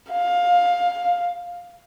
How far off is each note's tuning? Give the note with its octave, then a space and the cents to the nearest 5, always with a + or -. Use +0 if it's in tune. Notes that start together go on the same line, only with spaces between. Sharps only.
F5 +15